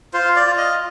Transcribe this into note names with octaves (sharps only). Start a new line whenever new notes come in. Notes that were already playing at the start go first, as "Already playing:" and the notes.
F4 C5
D5
F4
D#5